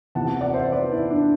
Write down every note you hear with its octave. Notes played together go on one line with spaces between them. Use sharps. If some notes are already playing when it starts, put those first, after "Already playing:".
E2 C3 E3 F#5 A5
D5 F#5
C5 E5
B4 D5
E4
D4